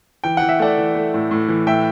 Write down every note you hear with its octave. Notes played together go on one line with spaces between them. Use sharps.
E3 G5
E3 F#5
E5
A3 D5 F#5
E3
A3
A2
A2
E3
A2 E5 G5